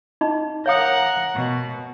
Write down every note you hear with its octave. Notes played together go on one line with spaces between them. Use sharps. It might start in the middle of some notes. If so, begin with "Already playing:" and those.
D#4 D#5 B5
A#4 C#5 F5 F#5 D#6
B2